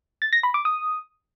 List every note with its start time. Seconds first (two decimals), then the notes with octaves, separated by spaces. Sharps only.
0.22 A6
0.33 A#6
0.43 B5
0.54 D6
0.65 D#6